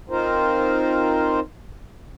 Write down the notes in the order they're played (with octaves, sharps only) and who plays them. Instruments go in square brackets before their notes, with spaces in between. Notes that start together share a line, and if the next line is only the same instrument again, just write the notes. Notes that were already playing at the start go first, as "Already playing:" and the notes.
[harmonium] C4 D#4 F4 A#4 C5